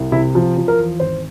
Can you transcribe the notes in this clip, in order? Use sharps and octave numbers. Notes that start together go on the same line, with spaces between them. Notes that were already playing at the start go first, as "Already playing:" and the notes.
Already playing: C2
C3 E4
F3
F3
A#4
E2
G#1 C5